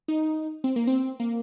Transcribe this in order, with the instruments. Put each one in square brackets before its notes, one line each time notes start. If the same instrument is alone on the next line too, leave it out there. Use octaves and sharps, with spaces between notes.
[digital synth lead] D#4
C4
A#3
C4
A#3